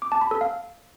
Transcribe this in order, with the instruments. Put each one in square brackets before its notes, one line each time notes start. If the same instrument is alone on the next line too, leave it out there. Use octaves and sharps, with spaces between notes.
[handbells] D6
A5
B5
A4
F5